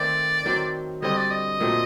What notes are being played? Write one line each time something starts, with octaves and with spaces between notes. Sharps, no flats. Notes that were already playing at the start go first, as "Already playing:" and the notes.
Already playing: D#3 A3 C4 D5
D#3 F#3 C4
D3 G3 C4 F#4 D#5
D5
D#5
A#2 F#3 A3 C4